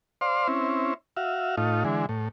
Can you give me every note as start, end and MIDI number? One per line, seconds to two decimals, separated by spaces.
0.21 0.47 72
0.21 0.47 74
0.21 0.47 77
0.21 0.47 84
0.48 0.94 60
0.48 0.94 61
0.48 0.94 64
1.17 1.56 66
1.17 1.56 76
1.17 1.56 77
1.57 1.84 45
1.57 1.84 63
1.57 1.84 65
1.84 2.06 50
1.84 2.06 52
1.84 2.06 56
2.09 2.28 45